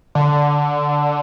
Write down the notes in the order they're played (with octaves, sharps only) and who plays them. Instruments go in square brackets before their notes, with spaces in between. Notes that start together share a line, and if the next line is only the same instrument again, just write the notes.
[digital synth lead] D3